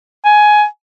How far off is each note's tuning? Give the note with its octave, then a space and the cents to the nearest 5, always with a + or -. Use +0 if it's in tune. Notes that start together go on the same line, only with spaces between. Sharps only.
G#5 +15